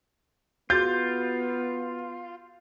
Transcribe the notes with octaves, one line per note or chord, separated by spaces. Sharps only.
B3 F4 F#4 G#4 G6 A6